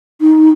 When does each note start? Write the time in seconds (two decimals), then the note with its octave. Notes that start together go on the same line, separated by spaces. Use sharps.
0.21 D#4